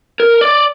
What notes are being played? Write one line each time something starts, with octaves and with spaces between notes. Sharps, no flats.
A#4
D5